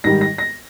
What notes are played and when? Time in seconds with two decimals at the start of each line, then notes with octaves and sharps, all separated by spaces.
0.04 G#2 D#3 G3 A#6
0.21 A#6
0.38 A#6